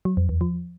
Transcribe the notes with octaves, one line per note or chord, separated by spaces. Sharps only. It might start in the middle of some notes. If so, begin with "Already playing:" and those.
F#3
F2
E2
F3